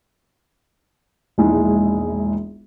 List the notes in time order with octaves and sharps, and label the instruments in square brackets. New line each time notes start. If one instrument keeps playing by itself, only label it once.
[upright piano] E1 A#1 G#3 D#4 E4 E5